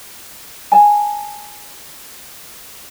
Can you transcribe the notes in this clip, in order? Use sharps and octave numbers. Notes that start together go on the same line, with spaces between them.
G#5 A5